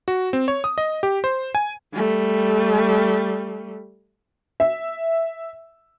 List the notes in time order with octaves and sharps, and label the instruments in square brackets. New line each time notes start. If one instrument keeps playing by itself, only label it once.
[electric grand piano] F#4
C4
C#5
D#6
D#5
G4
C5
G#5
[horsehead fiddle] G3 A3
[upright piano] E5